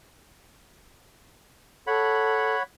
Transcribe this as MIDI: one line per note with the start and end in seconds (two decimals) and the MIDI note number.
1.87 2.56 69
1.87 2.63 73
1.87 2.63 78
1.87 2.63 83